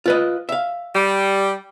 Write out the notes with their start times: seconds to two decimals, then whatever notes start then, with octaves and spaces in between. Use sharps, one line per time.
0.06 F4 B4 D#5
0.49 E5 F5
0.94 G3